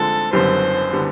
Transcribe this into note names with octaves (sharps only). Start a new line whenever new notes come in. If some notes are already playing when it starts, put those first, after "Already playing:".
Already playing: D3 F3 G#3 C4 A4
F#1 F#2 D3 G3 B3 C5
D3 G3 B3